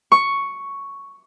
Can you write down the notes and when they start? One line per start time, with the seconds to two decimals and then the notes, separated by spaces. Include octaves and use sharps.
0.12 C#6